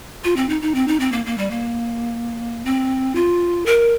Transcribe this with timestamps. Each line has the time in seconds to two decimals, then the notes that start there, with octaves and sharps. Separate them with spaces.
0.24 F4
0.36 C4
0.49 D#4
0.62 D#4
0.75 C4
0.88 D#4
1.00 C4
1.12 A#3
1.26 A#3
1.38 G3
1.51 A#3
2.65 C4
3.15 F4
3.66 A#4